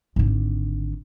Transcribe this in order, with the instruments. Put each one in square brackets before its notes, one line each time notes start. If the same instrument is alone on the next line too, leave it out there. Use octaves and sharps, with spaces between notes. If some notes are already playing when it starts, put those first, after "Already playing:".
[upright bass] G#1 D3